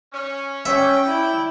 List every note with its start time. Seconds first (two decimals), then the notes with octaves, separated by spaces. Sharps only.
0.12 C#4
0.66 C#4 D5 E5 G5
1.06 E4